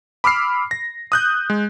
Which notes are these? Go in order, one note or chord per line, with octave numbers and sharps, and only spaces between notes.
B5 D6 E6 F6 C7
A#6
D#6 F#6 G6
G#3